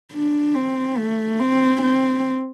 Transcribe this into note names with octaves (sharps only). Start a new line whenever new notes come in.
D4
C4
A3
C4
C4